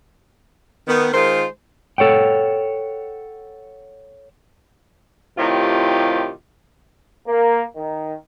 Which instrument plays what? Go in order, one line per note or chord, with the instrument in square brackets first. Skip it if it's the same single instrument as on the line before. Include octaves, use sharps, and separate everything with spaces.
[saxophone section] D#3 B3
D#3 G#3 F4 A#4 C5
[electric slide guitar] A4 C#5 F#5 G5
[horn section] A2 C3 D#3 F4 G4
[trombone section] A#3
D#3